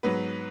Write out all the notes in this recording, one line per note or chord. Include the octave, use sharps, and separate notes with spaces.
G#2 F#3 B3 B4